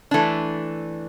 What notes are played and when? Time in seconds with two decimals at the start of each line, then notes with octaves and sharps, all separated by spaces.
0.11 E3 A3 D4